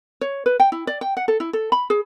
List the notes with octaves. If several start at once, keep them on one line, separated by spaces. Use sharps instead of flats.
C#5
B4
G5
E4
D5
G5
F#5
A4
E4
A4
B5
G#4